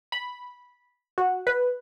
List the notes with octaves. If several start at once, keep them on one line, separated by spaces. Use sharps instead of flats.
B5
F#4
B4